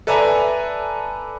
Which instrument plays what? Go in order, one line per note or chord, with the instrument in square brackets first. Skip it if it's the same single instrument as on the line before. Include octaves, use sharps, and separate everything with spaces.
[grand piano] A4 B4 D5 E5 G#5 A#5